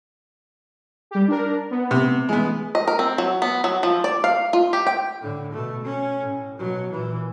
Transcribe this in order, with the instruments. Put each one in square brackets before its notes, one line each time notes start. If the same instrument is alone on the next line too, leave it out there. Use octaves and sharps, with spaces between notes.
[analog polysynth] G3 G4
D4 A#4
B3
[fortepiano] C3
[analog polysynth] E3 [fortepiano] G#3 B3
[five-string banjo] D#5
A#4
C4
F#3
B3
F#3
F3
D5
F5
F4
G4
G5
[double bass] A2 D3
B2 A3
C#4
A2
B2 F#3
A#2 E3